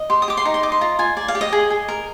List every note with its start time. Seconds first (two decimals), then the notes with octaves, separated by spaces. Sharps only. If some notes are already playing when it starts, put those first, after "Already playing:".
Already playing: D#5
0.10 G4 C6
0.22 D#6
0.28 G4 D6
0.37 C6
0.45 D#4 A#5
0.54 C6
0.63 D#5 D6
0.72 C6
0.81 F4 A#5
0.99 F4 G#5
1.17 D5 G#5
1.28 F5
1.35 G4
1.41 D#5
1.52 G#4
1.71 G#4
1.88 A#4